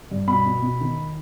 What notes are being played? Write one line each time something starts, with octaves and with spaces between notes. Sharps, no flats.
G2
B2 B5
B2
B2
D#3